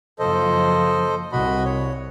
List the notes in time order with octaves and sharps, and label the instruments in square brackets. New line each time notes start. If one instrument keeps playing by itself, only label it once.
[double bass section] F#1 F3 [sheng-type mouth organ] A4 C5 D#5
[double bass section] C2 [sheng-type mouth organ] F#4 D#5 B5
[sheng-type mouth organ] C#5